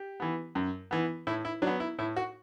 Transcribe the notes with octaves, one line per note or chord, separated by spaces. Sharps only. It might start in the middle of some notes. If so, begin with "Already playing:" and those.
Already playing: G4
E3 B3
F#2
E3 B3
A2 E4
E4
F#3 D4
B3
E4
A2 E4
F#4